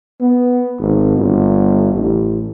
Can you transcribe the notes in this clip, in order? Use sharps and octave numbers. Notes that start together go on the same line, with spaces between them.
B3
G#1
G1
A1